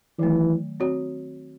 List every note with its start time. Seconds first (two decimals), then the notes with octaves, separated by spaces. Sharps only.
0.19 D#3 E3 F#3 A3
0.80 C4 F#4 C#5